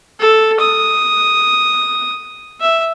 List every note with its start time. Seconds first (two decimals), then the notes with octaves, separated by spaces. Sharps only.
0.20 A4
0.60 D#6
2.61 E5